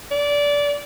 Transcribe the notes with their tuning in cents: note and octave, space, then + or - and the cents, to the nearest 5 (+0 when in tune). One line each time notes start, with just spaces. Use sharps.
D5 -20